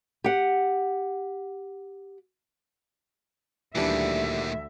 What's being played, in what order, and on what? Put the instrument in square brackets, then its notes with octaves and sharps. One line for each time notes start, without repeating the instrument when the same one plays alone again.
[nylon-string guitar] G4 F#5
[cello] D2 E5 [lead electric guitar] A#2 D#3 [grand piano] E3 G3 D4